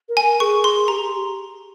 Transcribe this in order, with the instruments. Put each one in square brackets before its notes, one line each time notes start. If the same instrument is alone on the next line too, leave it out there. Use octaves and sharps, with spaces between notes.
[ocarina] A#4
[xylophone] G#5
[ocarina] A#4
[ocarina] G#4 [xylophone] C#6
[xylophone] C6
[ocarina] G4 [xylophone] A#5